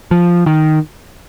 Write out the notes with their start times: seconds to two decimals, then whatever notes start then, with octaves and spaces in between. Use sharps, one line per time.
0.11 F3
0.46 D#3